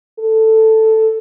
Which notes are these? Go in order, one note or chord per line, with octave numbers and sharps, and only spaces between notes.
A4